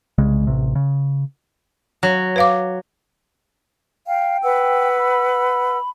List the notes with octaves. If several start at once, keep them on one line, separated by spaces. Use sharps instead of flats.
C2 C#3 G#3
A1 C3
C#3
F#3
B4 F5 D6
F5 G5
B4 F#5 E6
B5